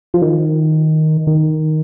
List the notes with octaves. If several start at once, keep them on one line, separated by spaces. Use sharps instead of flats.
F3
D#3
D#3